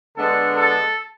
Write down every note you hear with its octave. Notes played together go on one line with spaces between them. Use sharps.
D3 G#3 B3 D4 A4
A4